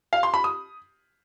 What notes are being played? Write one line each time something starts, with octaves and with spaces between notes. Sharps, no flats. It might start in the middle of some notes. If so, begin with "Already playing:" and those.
F5
C6
B5
D#6